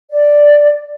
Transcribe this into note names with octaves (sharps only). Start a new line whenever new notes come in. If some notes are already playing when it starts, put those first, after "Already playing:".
D5